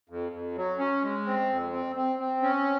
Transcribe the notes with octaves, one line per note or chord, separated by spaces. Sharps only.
F2
F2
F#3
C#4
G#3
C4
F2
C4
C4
C4
C#4